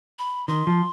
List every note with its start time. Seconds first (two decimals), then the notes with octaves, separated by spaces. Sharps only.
0.19 B5
0.48 D#3 C6
0.67 F3